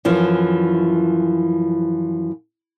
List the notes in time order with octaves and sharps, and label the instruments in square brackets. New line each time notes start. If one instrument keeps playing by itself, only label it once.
[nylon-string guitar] F#2 E3 F3